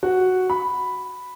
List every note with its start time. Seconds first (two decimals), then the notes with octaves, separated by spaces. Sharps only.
0.03 F#4
0.50 B5